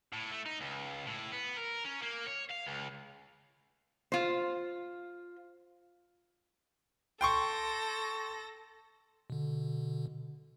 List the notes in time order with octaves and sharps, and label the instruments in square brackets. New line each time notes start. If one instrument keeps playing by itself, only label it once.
[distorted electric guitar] A2
A3
D#4
C#2
A2
B3
A#4
C#4
A#3
C#5
F5
C#2
[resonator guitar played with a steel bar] F4 C5
[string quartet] A4 A#6 [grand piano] G5 C6 C#6
[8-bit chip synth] B2 D3